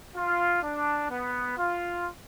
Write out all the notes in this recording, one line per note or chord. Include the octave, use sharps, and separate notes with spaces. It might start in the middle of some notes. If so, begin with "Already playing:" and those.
F4
D4
B3
F4